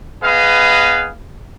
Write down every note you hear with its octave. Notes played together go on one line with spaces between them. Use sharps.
B3 G#4 B4 D#5 F5